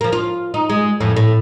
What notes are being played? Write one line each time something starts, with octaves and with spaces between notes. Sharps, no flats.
F3 A#3
F4
D#4
G#3
F2 A2 E3
A2